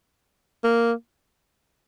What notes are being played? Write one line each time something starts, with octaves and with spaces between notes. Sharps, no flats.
A#3